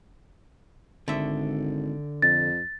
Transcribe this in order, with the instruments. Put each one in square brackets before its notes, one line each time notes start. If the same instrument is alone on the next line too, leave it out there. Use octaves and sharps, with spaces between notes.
[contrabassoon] G#1 [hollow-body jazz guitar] D3 E5
[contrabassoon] F2 [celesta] A6